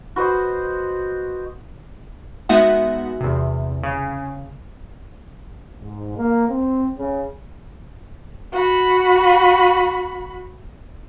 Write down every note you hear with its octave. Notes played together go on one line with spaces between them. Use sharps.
F#4 B4 C5 D#5
G#3 B3 D#4 F#4 E5 F#5
E2 C3
C#3
G#2
A#3
C4
C#3
F#4 B5